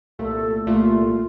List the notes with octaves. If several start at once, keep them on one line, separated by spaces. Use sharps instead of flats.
C2 A#2 A3 A4 A#4
C2 A#2 A3 F4